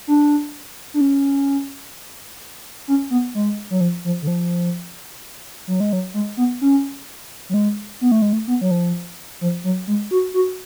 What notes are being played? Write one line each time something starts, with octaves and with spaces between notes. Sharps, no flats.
D4
D4
C#4
C#4
B3
G#3
F#3
F3
F3
D3
F3
F#3
G#3
F#3
G#3
B3
C#4
F#3
G#3
B3
A3
G#3
A3
B3
F#3
F3
F3
F#3
G#3
F#4
F#4